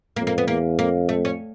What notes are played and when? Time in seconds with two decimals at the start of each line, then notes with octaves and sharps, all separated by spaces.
0.16 F2 A#3
0.27 A#3
0.38 B3
0.48 E2 A#3
0.79 F2 A#3
1.09 A3
1.25 C#4